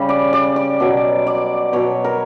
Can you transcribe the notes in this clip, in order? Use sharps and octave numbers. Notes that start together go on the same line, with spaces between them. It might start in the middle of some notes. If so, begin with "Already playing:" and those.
Already playing: C#3 G3
D5
D5
D5
B2 F#3
D5
B2 F#3 C#5
A#4